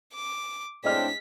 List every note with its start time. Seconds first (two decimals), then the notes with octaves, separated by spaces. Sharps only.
0.14 D6
0.84 A2 C4 D4 G#4 D#5 F6 B6